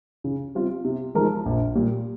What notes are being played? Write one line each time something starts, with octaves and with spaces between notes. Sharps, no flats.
C#3
G3 C4 F4
C3
F3 G#3 D#4 A#4
A#1
A#2 G3